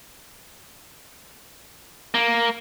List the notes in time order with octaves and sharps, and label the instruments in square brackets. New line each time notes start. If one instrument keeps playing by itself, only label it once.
[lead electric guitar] A#3